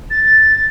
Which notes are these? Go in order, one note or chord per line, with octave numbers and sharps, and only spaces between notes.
A6